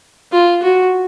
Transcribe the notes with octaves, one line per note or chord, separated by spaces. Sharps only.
F4
F#4